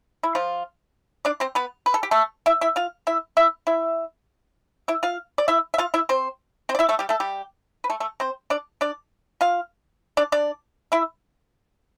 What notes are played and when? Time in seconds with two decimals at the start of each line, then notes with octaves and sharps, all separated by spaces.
0.23 E4
0.35 F3 F4
1.25 D4 D5
1.40 C4 C5
1.55 B3 B4
1.86 B4
1.94 A4
2.03 G4
2.11 A3 A4
2.46 E4 E5
2.61 E4 E5
2.76 F4 F5
3.07 E4 E5
3.37 E4 E5
3.67 E4 E5
4.88 E4 E5
5.03 F4 F5
5.38 D5
5.48 E4 E5
5.74 E5
5.78 F4 F5
5.94 E4 E5
6.09 C4 C5
6.69 C4 C5
6.75 D5
6.79 E4 E5
6.89 A3 A4
6.99 G3 G4
7.09 A3 A4
7.20 G3 G4
7.84 B4
7.90 A3 A4
8.00 A3 A4
8.20 C4 C5
8.50 D4 D5
8.81 D4 D5
9.41 F4 F5
10.17 D4 D5
10.32 D4 D5
10.92 E4 E5